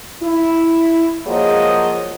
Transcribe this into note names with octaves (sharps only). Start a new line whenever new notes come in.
E4
F3 F#3 A#3 G#4 D#5